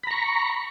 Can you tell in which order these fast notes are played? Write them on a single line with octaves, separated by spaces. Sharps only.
B5 A#5 C#6